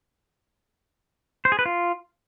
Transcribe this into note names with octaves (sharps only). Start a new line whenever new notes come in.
C5
G#4
B4
F4